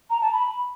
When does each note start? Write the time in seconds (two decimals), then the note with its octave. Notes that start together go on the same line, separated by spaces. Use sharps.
0.10 A#5
0.21 A5
0.33 B5